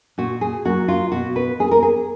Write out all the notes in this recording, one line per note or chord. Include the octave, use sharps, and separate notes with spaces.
A#2 F#4
G#4
F#3 A#3 F#4
F4
B2 F#4
B4
A#3 G#4
A#4
G#4